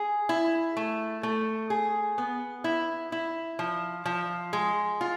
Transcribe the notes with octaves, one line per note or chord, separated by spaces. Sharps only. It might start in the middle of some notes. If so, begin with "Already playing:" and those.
Already playing: G#4
E4
A3
A3
G#4
B3
E4
E4
F3
F3
G#3
F4